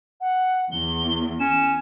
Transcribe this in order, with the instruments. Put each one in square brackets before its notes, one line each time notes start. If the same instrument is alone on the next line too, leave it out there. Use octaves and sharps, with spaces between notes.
[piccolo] F#5
[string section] E2 [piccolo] G7
[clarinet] C#4 [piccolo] E7